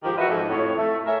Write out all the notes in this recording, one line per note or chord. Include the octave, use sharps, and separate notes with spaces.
G#2 D#3 F3 G4
E3 F3 F#4 B4 D#5 E5
F2 G#2 C4
F2 A2 C#5
A3
G#4 A#4 C#5 E5